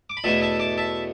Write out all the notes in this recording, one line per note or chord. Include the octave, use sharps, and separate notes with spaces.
D6
B5
E2 B2 A3 E4 E5 A5
E5 A5
A5 D6
E5 A5